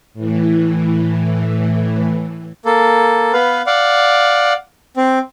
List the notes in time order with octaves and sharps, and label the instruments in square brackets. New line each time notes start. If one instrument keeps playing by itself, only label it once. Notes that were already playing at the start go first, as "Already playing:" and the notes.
[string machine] A2 E3
[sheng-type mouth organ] A#3 A4
B3 B4 F5
D5 F5 F#5
C4